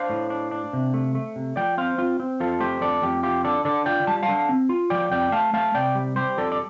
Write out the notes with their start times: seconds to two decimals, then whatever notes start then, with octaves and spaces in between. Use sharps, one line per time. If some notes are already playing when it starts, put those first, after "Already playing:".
Already playing: D4 C5 F5
0.10 A2
0.30 D4
0.51 D4
0.73 C3
0.94 A3
1.15 A3
1.36 C3
1.56 F3 D5 G5
1.78 C4 C5 F5
1.98 C4 F4
2.20 C4
2.40 F2 F4 A4
2.60 A3 G4 C5
2.81 F2 A4 D5
3.02 F2 G4
3.23 F4 G4
3.44 D3 A4 D5
3.65 D3 A4 D5
3.86 F4 D5 G5
4.07 G3 A5
4.23 F5 A5
4.28 D3
4.49 C4
4.69 F4
4.90 F3 D5 G5
5.11 F2 D5 G5
5.32 A3 F5 A5
5.53 A3 F5 A5
5.75 C3 D5 G5
5.95 G3
6.16 G3 G4 C5
6.37 F2 A4 D5
6.52 D5